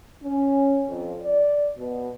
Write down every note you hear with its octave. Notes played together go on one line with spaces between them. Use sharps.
C#4
F2
D5
B2